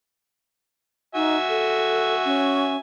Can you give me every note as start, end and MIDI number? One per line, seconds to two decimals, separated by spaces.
1.15 1.37 63
1.15 2.79 66
1.15 2.79 76
1.15 2.79 80
1.49 2.15 69
2.25 2.76 61